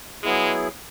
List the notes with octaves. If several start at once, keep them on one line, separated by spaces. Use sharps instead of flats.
F#3 G#3 B3 E4 G#4